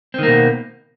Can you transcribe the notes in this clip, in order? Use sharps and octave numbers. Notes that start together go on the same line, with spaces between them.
B2 D#3 A#3 C4